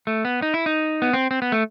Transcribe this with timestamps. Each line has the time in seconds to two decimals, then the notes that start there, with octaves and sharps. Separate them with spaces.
0.07 A3
0.25 B3
0.42 D#4
0.54 E4
0.66 D#4
1.02 B3
1.13 C4
1.31 C4
1.42 B3
1.52 A3